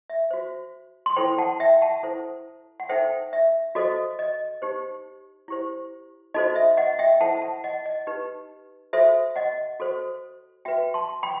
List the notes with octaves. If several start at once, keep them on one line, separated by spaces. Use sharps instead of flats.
E5
F#4 C5
C6
E4 A4 C5 G5 B5
F#5 A5
E5 G5
F#5 A5
E4 A4 C5
F#5
D#4 A4 C5 E5 G5
E5
F#4 A4 C5 D#5
D#5
D#4 G4 C5
E4 G4 C5
D#4 F#4 A4 C5 D#5
E5
D#5 F#5
E5 G5
E4 A4 C5 F#5 A5
F#5 A5
D#5 F#5
D#5
D#4 G4 B4
F#4 A4 C5 E5
D#5 F#5
F#4 A4 C5
F#4 B4 E5 G5
A5 C6
G5 B5